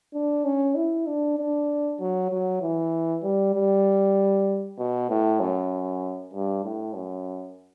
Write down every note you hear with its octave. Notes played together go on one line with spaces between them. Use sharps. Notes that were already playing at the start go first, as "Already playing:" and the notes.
D4
C#4
E4
D4
D4
F#3
F#3
E3
G3
G3
B2
A2
F#2
G2
A2
F#2